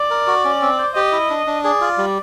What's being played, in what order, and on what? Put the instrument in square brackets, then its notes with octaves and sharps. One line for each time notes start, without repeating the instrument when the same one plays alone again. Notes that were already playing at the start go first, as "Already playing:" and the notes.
Already playing: [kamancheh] D5
[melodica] A#4
F#4
C#4
C4
C5
[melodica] G4 [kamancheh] D#5
[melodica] E4
D4
D4
[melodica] G#4 [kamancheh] D5
[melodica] F4
G3